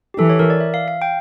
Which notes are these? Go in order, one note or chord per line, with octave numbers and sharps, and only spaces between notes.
G4
E3 A4
C#5
A#4
D5
E5
F5
F5
G5